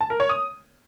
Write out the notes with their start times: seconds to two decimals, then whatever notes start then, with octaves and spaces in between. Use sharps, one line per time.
0.01 A5
0.10 A#4
0.20 C#5
0.29 D#6